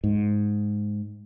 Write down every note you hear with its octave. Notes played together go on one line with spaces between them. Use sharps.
G#2